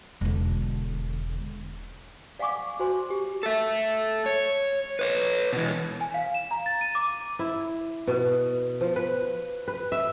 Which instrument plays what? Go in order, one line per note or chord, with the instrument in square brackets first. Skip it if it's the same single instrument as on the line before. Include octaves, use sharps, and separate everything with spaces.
[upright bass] E1 D3
[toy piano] D5 F5 F#5 G#5 C#6 D6
F#4 C5 G#5 C6
G4
[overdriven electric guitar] A4 E5
C#5
B4 C#5
B2 E3
[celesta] G#5
F5
E7
A#5
A6
D#7
D6
[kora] E4
B2
F3
B4
B4
E5